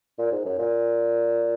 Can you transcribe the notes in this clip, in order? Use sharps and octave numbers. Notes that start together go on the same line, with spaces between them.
A#2
G#2
F#2
A#2